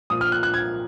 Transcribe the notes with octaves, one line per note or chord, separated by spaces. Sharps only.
A#2 F3 D#6
F6
F#6
F#6
G#6